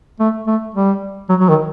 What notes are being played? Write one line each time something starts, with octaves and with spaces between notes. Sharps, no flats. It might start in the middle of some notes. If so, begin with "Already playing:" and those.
A3
A3
G3
F#3
F#3
D#3